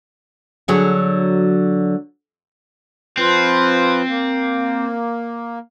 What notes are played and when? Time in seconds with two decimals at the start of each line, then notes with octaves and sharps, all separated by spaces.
0.68 D3 F#3 G#4
3.17 F3 C4 F4 B4
4.07 A#3